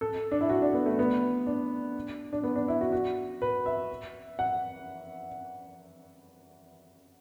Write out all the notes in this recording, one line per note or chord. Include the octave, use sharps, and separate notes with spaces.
A4
D4
E4
F#4
D4
B3
A3
B3
D4
D4
B3
D4
E4
F#4
F#4
B4
E5
F#5